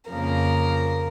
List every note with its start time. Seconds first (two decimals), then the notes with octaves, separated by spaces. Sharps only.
0.10 F2 C#3 F3 A#3 A#4